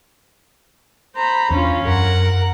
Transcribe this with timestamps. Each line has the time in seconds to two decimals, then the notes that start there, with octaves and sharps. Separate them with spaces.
1.15 C5 A#5 B5
1.50 E2 C#4 D4 F4
1.87 F#2 A#4 F#5